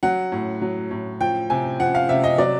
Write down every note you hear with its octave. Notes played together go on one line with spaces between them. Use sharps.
F#3 F#5
A2
F#3
A2
F3 G5
C3 G#5
F3 F#5
F5
C3 E5
D#5
F#3 D5